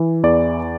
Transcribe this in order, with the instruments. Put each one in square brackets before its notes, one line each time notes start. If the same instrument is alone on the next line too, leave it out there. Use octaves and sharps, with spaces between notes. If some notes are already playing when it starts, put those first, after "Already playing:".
Already playing: [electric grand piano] E3
E2 D5